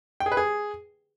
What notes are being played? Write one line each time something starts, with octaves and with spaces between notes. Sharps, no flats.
G5
G#4
B4
G#4